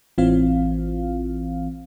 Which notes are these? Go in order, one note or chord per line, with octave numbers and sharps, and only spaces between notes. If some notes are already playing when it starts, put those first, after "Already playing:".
A1 E3 C4 F4 F5